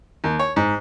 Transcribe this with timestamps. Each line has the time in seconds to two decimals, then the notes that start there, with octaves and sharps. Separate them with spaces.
0.24 D#2
0.39 C#5
0.56 G#2